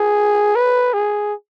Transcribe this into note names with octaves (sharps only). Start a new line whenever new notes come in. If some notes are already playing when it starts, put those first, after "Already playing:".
Already playing: G#4
B4
G#4